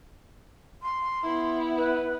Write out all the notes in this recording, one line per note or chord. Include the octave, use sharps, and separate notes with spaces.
C6
B3 E4
B4